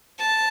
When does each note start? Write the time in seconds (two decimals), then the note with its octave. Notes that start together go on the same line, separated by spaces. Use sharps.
0.19 A5